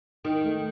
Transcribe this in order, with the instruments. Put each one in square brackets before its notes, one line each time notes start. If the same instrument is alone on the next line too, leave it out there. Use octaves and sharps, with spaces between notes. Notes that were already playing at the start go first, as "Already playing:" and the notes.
[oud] D#3 [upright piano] D#4
[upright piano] A3